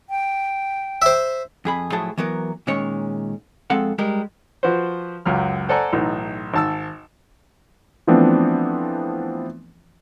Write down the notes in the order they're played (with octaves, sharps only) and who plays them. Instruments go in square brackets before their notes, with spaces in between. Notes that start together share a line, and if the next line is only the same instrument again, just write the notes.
[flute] G5
[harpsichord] C5 E5
[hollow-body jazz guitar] F2 G#4 B5
A2 F3 F#3 E4 G#4 A5
E3 F#3 B3 A#4
A#2 D#3 G#3 C#4 C#5
F2 G#3 C4 A4 F5 F#5
G3 G#3 G4 A#4
[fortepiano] F3 F#4 B4 C5
C#2 F#2 F#3 F6
A4 C5 D5 F#5 G#5 A#5
B1 A2 E3 D#4
G#1 A5 E6
[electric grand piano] E3 F3 A3 B3 C4 D4